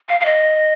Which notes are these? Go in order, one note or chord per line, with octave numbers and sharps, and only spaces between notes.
F5
F5
D#5